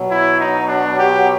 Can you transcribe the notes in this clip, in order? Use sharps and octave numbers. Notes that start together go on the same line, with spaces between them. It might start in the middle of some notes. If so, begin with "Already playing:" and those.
Already playing: B2 F#3
E4
D#4
D4
G4